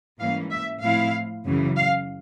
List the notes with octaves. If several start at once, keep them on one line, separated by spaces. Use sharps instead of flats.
G#2 E3 G3 A#3 C#4 F5
E5
A2 F3 A3 C4 E4 F5
F#2 C#3 E3
F5